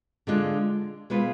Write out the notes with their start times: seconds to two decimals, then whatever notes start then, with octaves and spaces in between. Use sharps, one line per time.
0.27 D3 G#3 D4 F4
1.10 B2 G#3 B3 F4 B4